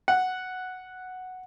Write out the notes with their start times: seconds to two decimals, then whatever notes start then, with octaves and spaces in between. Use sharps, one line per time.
0.08 F#5